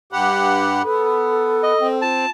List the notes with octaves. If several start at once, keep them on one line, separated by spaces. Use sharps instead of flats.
G2 G4 F#5 B5
B3 A4
D#5
C4 G5
F4 A5